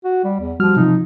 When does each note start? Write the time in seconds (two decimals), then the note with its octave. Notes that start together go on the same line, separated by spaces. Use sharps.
0.04 F#4
0.24 G3
0.40 E2
0.60 F3 G3 F#4 F6
0.77 C3 F3 D#4